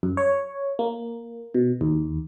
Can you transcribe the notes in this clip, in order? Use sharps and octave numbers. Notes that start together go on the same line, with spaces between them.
F#2
C#5
A#3
B2
D#2